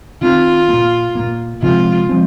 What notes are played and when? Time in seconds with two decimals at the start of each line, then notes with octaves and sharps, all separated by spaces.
0.21 D#3 C4 F4
0.69 A#2 A#3
1.15 A#2 A#3
1.62 C3 F3 G#3 C4 F4
2.09 F3 G#3 C4